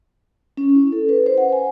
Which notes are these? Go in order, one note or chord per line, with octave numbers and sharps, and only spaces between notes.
C#4
E4
A4
B4
C5
F#5
G#5